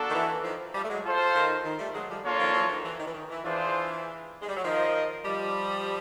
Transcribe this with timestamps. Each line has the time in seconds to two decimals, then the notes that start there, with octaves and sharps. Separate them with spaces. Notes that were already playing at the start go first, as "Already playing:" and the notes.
Already playing: A#3 D4 F#4 A4
0.10 D#3
0.15 E3
0.44 D#3 F3
0.75 F3 G3
0.84 A3
0.89 F#3 G#3
1.05 F4 A4 C5 F5
1.35 D#3
1.65 D#3
1.79 G3 A3
1.94 F#3 G#3
2.10 F3 G3
2.25 A#3 D4 F4 A4 C#5
2.39 D#3 F3
2.54 E3 F#3
2.69 D#3 F3
2.85 E3
3.00 D#3
3.07 E3
3.14 D#3
3.30 E3
3.45 E3 D4 F4 G#4 C5
4.42 G#3
4.49 G3
4.57 F#3
4.64 D#3 F3 F4 A#4 D#5
5.24 F3 G3